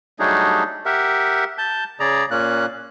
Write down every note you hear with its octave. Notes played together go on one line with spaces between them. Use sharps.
F#3 G3 A3 D4 D#4 G#4
G4 A#4 E5 F#5
A5 G6
C#3 G#4 D5 A#5
A#2 A#3 C#4 F#6